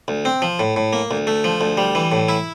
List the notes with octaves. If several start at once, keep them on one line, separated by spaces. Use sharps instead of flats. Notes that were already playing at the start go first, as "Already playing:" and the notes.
D2
C4
F3
A2
A2
A#3
D2
A3
F3
D2
G3
E3
A2
E4